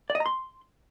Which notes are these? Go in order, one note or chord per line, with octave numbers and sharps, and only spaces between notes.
D5
D#5
A#5
C6